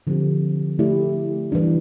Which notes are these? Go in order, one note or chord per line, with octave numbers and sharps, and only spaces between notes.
D3 F3 C4 G4
A3 E4 G4 D5
E3 G3 D4